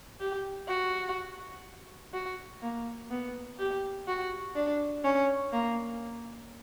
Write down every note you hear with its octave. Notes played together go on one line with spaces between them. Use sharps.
G4
F#4
F#4
A#3
B3
G4
F#4
D4
C#4
A#3